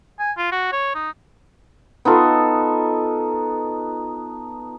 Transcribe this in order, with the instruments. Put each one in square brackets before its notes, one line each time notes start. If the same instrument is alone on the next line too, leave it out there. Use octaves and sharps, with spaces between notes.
[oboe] G#5
F4
F#4
C#5
D#4
[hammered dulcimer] B3 D#4 F4 A4